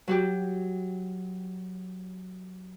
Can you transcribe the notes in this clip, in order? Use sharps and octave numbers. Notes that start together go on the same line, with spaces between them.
F#3 F#4 G4